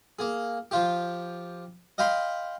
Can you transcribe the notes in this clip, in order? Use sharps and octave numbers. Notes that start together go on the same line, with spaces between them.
A#3 G#4
F3 F4 G4
D#5 F5 G5 B5 C6